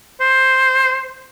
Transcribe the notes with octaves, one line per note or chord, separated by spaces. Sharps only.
C5